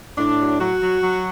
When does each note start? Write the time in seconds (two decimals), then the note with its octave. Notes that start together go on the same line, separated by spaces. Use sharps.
0.17 A2 D4
0.39 F#3
0.59 F#3 F#4
0.81 F#3
1.02 F#3